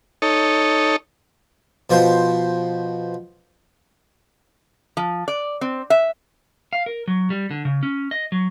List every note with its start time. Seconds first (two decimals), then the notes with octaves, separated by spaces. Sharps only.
0.22 D#4 A4 C#5
1.90 B2 F3 C5
4.97 F3
5.28 D5
5.61 C4
5.90 E5
6.73 F5
6.86 A#4
7.08 F#3
7.30 G3
7.51 D3
7.65 C#3
7.83 C#4
8.11 D#5
8.32 F#3